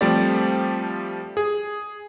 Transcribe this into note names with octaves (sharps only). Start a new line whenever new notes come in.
F3 G3 A3 C4 G4 D5
G#4